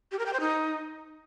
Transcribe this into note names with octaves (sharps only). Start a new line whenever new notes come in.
G4
A#4
G5
C5
D#4